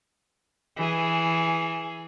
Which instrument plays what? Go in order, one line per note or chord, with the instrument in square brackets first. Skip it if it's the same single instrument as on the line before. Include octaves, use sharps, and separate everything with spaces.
[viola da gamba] E3 G#4